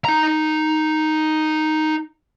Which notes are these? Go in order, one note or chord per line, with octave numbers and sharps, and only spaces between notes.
D#4 A#5